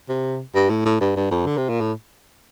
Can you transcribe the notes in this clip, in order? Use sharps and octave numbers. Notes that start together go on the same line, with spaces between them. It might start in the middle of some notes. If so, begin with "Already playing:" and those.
C3
G2
A2
A2
G2
G2
F2
D3
C3
A#2
A2